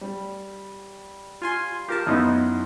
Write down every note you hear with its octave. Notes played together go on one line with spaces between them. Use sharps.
G3
F4 G#5 C6
F4 G4 A#4 A5
F#2 B3 D#4 E4 D#5 C6